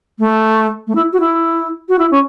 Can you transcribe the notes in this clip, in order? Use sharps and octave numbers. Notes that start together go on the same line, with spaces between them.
A3
A3
E4
F#4
E4
F#4
E4
C#4